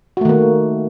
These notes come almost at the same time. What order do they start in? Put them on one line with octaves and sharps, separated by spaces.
F#4 A3 D#3 A#3